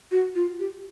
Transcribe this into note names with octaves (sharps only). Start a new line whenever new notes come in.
F#4
F4
G4